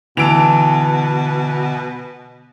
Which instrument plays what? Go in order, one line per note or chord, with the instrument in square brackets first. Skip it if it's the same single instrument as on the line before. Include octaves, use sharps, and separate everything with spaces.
[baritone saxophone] B2 [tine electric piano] D3 E6 [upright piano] E3 [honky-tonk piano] A5 D7 F7